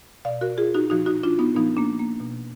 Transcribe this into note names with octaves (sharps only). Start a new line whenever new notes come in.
B2 D5 F5
F#4 A#4
F4 G#4
D#4 F#4
A#2 F3 D#4 F#4
D#4 F#4
D4 F4
B3 D#4
A#2 F3 B3 D#4
A#3 D4
A#3
B2